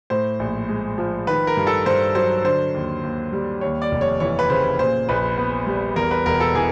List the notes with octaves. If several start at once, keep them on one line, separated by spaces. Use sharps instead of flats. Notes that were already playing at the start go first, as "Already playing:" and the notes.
A2 C5
A#1
G#3
F3
D#3 B4
A#4
G2
A4
G2 C5
F#3 C5
D3 C5
D#2
D#2
G3
D#2 C#5
D5
F1
C#5
E3 C#5
B4
C#3 C5
A#2 C5
A#1 B4
B3
G3
E2 A#4
B4
E1 A#4
A4
E3 G#4